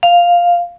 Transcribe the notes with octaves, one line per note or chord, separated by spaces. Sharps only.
F5